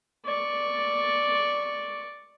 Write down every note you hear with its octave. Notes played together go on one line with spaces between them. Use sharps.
D5 C#6